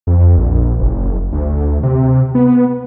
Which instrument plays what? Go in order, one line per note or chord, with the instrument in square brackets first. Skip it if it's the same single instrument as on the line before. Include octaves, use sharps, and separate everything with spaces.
[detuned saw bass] F2
A#1
F#1
D2
C3
B3